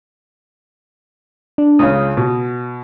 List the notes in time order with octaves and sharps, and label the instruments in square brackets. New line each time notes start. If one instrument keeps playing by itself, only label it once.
[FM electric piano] D4
[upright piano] C#2 C#3 [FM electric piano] D#6
[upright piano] B2